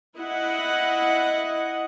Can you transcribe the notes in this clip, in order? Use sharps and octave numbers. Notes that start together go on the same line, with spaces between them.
E4 D#5 F#5